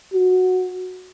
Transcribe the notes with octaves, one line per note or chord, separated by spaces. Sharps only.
F#4